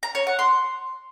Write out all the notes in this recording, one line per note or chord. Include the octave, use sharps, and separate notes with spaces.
A#5
C#5
F#5
C6